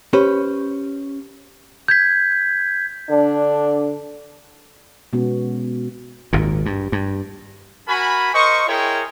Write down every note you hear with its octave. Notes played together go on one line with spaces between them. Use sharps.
C#4 G4 B4 C5
G6 G#6 B6
D3 D4
B2 G#3 B3 C#4 F#4
G#1 D#2 A#2
G2
G2
F#4 A#4 G#5 B5
A#4 C5 D#5 C#6
E4 G#4 A#4 C#5 G5